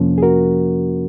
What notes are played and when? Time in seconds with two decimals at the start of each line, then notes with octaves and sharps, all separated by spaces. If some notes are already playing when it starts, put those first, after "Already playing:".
Already playing: F2 C3 F3 A#3 C#4
0.18 G#4
0.23 F#4 A#4